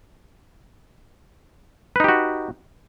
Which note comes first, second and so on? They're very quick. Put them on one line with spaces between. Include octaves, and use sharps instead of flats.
B4 D#4 G4 F#4